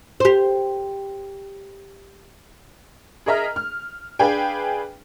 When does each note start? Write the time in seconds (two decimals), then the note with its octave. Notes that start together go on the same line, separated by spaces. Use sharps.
0.20 G4 C5
3.26 G#4 A#4 D#5 E5 A#5 F6
3.56 F6
4.19 D4 G#4 B4 F5 G5 G#5